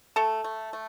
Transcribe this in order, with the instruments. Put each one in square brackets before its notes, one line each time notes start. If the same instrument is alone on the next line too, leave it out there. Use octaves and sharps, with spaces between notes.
[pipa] A3 A4 A5
A3
A3